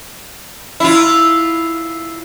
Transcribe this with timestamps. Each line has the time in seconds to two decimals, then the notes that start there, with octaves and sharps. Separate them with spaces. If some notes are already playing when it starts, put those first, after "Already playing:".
0.80 E4 F4